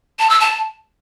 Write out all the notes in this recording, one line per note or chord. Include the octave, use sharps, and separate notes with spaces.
A5
E6
A5